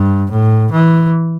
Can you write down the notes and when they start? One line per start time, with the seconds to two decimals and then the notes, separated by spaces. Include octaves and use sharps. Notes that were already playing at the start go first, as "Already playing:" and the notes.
Already playing: G2
0.31 A2
0.72 E3